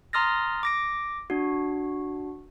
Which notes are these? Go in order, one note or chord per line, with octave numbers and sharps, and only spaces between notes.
A#5 C6 D#6 F6 A6 A#6
D6 A#6 D7
D4 F#4